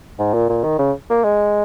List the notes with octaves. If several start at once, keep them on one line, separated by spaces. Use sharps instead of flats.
G#2
A#2
A#2
D#3
C#3
A#3
G#3